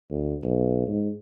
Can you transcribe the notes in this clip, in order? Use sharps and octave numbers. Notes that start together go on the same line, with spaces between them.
D2
B1
G#2